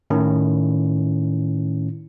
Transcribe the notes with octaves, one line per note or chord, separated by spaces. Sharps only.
A2 D#3 C#4 E4